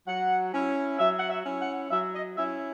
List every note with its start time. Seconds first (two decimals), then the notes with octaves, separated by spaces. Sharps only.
0.07 F#3 F#5
0.53 C#4 E4
0.99 F#3 E5
1.19 F#5
1.29 E5
1.45 C#4 E4
1.61 F#5
1.91 F#3 E5
2.14 D#5
2.37 C#4 E4 E5